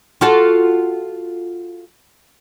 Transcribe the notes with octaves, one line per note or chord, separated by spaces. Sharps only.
F4 F#4 A4